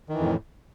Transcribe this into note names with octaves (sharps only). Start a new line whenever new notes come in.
F2 A2 D#3 E3